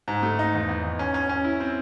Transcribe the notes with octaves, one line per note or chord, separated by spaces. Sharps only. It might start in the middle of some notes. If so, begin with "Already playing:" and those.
G#2
A3
D#4
E2
E2
E2
C#4
C#4
C#4
E4
C4